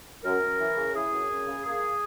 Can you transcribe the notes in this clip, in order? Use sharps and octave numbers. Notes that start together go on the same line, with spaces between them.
F#2 A#4
F#2
E3
C#3
E3 G#4
F#2
F#2
C#3
A#3 G#4